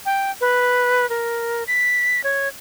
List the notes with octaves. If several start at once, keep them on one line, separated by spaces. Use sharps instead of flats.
G5
B4
A#4
B6
C#5